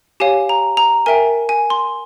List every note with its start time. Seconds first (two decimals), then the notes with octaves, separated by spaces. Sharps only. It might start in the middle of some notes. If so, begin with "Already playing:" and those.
0.20 G4 C#5 F5 G#5
0.49 A#5
0.77 A#5
1.06 A#4 E5 G5 G#5
1.49 G#5
1.70 C6